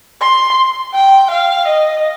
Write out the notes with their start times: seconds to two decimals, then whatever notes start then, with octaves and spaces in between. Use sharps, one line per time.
0.21 C6
0.94 G5
1.31 F5
1.68 D#5